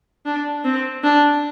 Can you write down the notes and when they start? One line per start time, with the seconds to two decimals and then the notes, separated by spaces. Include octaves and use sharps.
0.25 D4
0.65 C4
1.03 D4